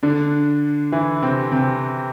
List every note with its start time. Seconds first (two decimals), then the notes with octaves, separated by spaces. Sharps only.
0.03 D3 D4
0.92 E3 E4
1.22 C3 C4
1.52 C3 C4